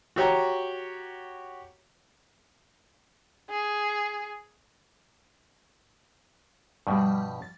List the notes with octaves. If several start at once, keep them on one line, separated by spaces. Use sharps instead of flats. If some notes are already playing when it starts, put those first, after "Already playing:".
F#4 G4 C#5 A#5
G#4
G2 B2 F3 G3
A6